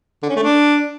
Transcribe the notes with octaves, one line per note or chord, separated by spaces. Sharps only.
D3
C#4
A3
D4